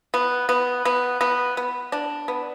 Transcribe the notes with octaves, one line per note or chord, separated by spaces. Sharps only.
B3
B3
B3
B3
B3
D4
B3